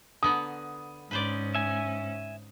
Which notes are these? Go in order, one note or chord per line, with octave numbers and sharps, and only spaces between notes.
D3 B3 A#5 D#6
G#2 C#4 B4 C5 D5
E5 G#5